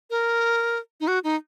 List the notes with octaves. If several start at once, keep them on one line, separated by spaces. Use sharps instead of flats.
A#4
D#4
F#4
D#4